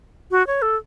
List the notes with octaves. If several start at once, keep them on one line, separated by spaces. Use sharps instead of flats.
F#4
C#5
A4